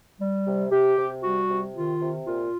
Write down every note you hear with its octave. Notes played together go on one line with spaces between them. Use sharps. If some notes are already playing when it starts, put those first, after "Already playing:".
G3
C3
C3 G4
C3
G3 F#4
C3
D#3 F4
C3
A#2 F4